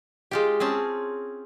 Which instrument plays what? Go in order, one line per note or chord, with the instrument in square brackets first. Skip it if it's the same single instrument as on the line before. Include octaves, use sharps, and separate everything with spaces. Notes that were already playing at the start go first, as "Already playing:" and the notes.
[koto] G#3 F4 G4
C4 C#4 G#4 A5